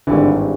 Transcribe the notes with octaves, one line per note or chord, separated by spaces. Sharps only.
G#1 G2 D3 E3
D#3